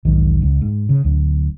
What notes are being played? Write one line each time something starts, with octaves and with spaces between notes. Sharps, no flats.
E1 B1 G#2 D#3
C#2
G#2
C#3
D1 D2